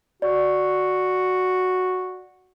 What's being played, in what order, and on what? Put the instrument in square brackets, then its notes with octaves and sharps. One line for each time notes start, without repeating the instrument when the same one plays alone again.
[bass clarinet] F#4 [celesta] D5